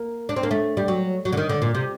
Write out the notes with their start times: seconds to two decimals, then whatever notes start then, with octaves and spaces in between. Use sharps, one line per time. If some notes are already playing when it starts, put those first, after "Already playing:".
Already playing: A#3
0.29 D4
0.36 C4
0.43 A#3
0.51 A3
0.77 G3
0.88 F#3
1.25 F#3
1.33 D3
1.37 D#3
1.49 D3
1.62 A#2
1.75 C3